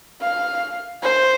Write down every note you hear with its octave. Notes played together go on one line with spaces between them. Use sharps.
F5
C5